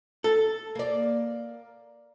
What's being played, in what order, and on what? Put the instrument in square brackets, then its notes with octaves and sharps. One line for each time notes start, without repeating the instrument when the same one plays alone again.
[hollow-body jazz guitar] A4
[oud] A#3 D5